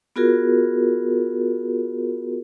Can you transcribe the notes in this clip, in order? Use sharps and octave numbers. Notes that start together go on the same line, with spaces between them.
B3 F4 F#4 G#4 A#4